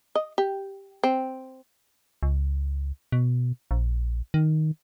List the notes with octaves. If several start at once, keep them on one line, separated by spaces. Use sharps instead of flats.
D#5
G4
C4
C#2
B2
A#1
D#3